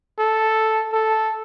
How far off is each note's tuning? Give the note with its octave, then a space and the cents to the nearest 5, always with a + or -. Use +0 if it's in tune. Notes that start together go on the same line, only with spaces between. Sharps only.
A4 +0
A4 -5